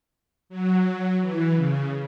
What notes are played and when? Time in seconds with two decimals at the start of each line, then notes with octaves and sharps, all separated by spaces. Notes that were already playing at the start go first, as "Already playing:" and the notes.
0.49 F#3
1.20 E3
1.56 C#3